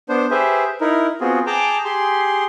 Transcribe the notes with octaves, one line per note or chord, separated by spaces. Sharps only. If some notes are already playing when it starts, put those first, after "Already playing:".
B3 D4 C5
G4 G#4 B4 C5 E5
D#4 E4 A#4
B3 C4 F4 F#4 G#4
G#4 G5 A5 A#5 D6
G4 G#4 C6